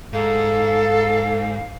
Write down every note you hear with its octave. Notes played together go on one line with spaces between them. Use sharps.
G#2 A4 F5